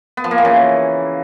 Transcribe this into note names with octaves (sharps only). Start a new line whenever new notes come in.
B3
F3
A#3
E3
C#3